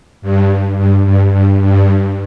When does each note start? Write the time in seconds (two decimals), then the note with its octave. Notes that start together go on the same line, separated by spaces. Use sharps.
0.22 G2
0.78 G2
1.06 G2
1.33 G2
1.62 G2